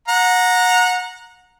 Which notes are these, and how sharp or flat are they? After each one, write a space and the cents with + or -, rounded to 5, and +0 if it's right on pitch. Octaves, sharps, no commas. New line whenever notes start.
F#5 -25 A#5 +0